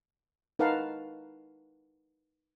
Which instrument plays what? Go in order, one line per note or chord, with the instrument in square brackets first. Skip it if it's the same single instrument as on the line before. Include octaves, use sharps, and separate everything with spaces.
[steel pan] D#4 A#4 B4 F5 F#5 A5